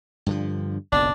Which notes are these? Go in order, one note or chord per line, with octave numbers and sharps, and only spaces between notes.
G2 D3 F3
F#1 B1 D4